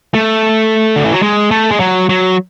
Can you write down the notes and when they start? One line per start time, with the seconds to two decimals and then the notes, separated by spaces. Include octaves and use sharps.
0.14 A3
0.96 D3
1.05 E3
1.13 F#3
1.22 G#3
1.51 A3
1.71 G#3
1.80 F#3
2.09 F#3